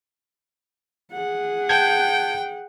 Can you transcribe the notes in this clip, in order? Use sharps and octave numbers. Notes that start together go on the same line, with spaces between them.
G#4 F#5
G5 A5 G6 G#6